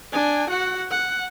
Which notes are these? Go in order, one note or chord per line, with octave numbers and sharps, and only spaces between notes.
D4 G#5
F#4 F#5
F#5